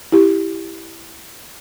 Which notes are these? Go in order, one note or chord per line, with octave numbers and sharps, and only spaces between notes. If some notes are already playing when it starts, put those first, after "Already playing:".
E4 G4